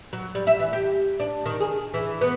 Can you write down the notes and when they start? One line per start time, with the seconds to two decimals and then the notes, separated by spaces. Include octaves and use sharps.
0.13 F#3
0.35 G3
0.47 E5
0.59 E3
0.73 G4
1.20 D4
1.46 D#3
1.60 G#4
1.94 E3
2.21 B3